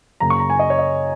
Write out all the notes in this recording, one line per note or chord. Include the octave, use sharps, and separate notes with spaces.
F#2 C#3 A#3 A#5
C#6
A#5
G#5
D#5
C#5
D#5